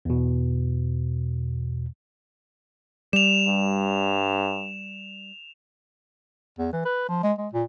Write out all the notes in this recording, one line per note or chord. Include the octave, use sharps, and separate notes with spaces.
E2 B2
G3 E7 F7
G2
E2
E3
B4
F3
G#3
G#3
A#2